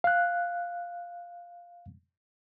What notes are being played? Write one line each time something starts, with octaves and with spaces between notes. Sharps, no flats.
F5 F#6